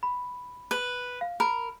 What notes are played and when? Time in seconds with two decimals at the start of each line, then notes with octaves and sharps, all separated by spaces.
0.03 B5
0.71 B4
1.21 F5
1.40 A#4 B5